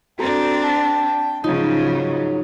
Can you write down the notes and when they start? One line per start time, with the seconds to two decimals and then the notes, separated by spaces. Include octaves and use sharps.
0.19 C4 D4 F#4 A4 G5 A#5
0.63 A5 B6
1.44 G#2 C#3 F3 F#3 D#4 F4